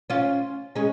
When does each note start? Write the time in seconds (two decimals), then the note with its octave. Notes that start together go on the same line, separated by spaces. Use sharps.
0.10 C#4 F4
0.75 G#3 C#4